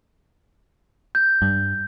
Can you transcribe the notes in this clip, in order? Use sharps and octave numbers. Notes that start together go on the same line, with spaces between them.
G6
G2